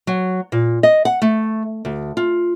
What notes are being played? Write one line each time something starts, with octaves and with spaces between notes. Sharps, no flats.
F#3
A#2
D#5
F#5
A3
D2
F4